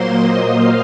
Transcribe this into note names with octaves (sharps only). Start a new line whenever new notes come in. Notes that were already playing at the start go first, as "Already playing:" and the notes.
Already playing: A#2 F#3 A#3 C5 C6
D#5 D#6
F5 F6